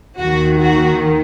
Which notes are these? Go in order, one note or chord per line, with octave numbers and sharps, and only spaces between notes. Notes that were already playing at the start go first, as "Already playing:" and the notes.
D#2 D#3 F#4
F#4